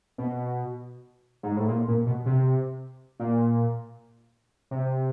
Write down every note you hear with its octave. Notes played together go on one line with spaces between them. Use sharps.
B2
G#2
A2
A#2
A#2
B2
C3
A#2
C3